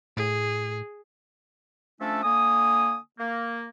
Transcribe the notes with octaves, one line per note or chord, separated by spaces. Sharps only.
A2 G#4
F3 A3 C#4 D4 A4 E5
D3 A#3 G#5 D#6
A#3